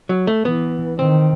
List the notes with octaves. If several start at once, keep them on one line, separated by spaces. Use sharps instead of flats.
F#3
A3
E3 B3
D#3 C4